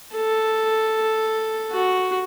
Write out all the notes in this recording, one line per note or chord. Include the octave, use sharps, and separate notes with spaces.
A4
F#4